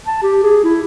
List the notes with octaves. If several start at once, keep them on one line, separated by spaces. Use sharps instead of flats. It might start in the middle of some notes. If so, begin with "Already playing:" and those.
A5
G4
G#4
E4